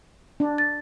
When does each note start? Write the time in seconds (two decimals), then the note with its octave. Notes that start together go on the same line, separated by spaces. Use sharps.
0.40 D4
0.58 A6